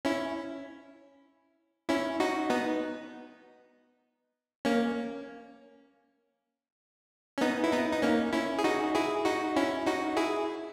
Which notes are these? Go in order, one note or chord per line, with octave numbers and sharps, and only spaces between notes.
C#4 E4
C#4 E4
D#4 F#4
B3 D#4
A#3 C#4
C#4
B3 D#4
E4
B3 D#4
D#4
A#3 C#4
C#4 E4
G#4
D#4 F#4
E4 G#4
D#4 F#4
C#4 E4
D#4 F#4
E4 G#4